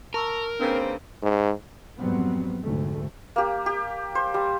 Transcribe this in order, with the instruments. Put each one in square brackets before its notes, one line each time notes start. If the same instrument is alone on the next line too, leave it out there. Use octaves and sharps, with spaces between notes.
[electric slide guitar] A#4 [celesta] A5 C#6 E6
[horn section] C#3 A#3 C4 [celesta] D4 B4
[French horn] G#2
[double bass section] F2 G#2 F#3 G3 B3 C4
F1 D2 G#2 A3
[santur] A#3 G4
G4
C5
G3